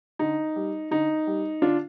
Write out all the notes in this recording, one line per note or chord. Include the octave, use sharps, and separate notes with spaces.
D3 D#4
G3
D3 D#4
G3
D3 D4 F4